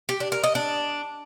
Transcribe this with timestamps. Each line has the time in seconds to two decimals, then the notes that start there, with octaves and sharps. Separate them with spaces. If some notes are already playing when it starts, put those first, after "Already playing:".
0.09 G4
0.20 D4
0.32 A#4
0.44 D#5
0.55 D4